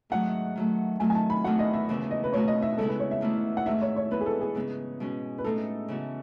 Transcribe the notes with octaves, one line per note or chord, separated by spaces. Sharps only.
G#2 D#3 F#3 A3 D#4 F#5
D#3 F#3 A3
D#3 F#3 A3 G#5
G#5
A5
B5
E2 D#3 A3 D#4 F#4 F#5
D#5
E5
D#2 C#3 E3 B3
D#5
B4
B2 A3 D#4 F#4 C#5
D#5
E5
C#3 G#3 B3 E4 A4
B4
C#5
E5
E2 D#3 A3 E4
F#5
G#2 D#3 A3 E4 E5
C#5
C#5
G#2 E3 B3 B4
G#4
A4
G#4
C#3 G#3 B3
B2 G#3 C#4 F#4
B4
A2 G#3 D#4 A4
C#3 E3 B3 F#4